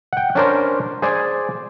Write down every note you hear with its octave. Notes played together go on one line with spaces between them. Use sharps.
F#5 G5
C#4 D4 A#4 C5
G#4 C5 D5 G#5